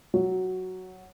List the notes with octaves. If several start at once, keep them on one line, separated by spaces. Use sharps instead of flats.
F#3